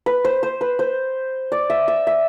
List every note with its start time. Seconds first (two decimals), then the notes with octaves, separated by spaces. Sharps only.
0.06 B4
0.25 C5
0.43 C5
0.61 B4
0.79 C5
1.52 D5
1.70 E5
1.88 E5
2.07 E5